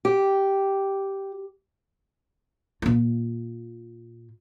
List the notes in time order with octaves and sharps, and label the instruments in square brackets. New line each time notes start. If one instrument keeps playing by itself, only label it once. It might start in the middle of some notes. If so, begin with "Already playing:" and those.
[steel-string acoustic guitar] G4
[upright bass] A#2 F4